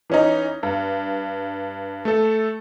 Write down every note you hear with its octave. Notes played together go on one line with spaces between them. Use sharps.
E3 C#4 D#4
G2
A3 A4